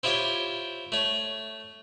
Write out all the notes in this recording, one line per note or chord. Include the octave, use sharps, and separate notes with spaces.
C4 E4 F4 G4 C#5
A3 C#5